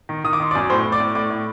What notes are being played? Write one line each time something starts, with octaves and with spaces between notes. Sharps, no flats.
D#3
D#3 D#6
D6
D#3 C6
D5 D6
F#2
A2 C5 C6
A2
D5 D6
A2
A2 D5 D6
A2